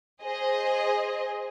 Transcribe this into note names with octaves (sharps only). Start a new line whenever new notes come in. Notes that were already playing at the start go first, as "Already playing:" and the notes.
G#4 C5 D#5